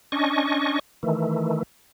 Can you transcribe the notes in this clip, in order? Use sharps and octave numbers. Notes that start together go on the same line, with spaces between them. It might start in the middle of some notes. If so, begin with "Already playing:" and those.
C#4 D4 D#5 C#6
D#3 E3 A3